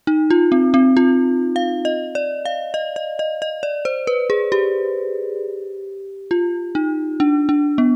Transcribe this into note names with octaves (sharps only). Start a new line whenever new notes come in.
D#4
F4
C4
C4
F4
F5
D#5
D5
F5
D#5
D#5
D#5
D#5
D5
C5
B4
G#4
G4
F4
D#4
D4
D4
B3